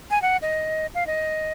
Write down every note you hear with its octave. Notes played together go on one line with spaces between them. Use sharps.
G#5
F#5
D#5
F5
D#5